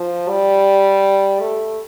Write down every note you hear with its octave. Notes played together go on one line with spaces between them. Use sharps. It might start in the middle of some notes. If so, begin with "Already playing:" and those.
Already playing: F3
G3
A3